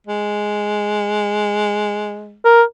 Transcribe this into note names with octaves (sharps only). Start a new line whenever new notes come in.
G#3
A#4